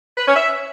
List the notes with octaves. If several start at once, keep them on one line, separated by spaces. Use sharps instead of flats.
B4
C#4
E5